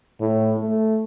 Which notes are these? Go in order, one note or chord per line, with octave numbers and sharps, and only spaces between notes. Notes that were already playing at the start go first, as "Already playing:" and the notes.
A2
A3